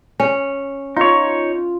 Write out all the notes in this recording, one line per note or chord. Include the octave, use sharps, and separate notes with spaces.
C#4
D#4 F4 C#5